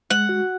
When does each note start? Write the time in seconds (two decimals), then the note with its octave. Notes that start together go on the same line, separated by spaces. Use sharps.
0.11 G#3 F#5
0.29 F#4